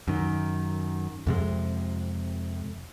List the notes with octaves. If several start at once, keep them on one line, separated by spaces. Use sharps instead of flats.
F#2 D#3
F2 C3 G#3